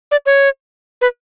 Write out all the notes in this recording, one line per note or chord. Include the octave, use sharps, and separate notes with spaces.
D5
C#5
B4